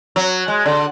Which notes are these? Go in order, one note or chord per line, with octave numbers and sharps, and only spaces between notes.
F#3
G#3
D3